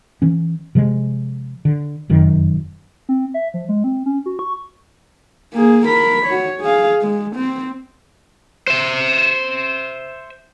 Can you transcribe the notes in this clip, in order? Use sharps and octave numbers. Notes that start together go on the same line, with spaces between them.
E3 C#4
C3 F3 G#3
D3
F1 F#2 D#3
C4
E5
F3
G#3
C4
C#4
F#4
C#6
A#3 G#4
A#4 B5
F#4 C#5
G#4 F5
G#3
C4
C5 E5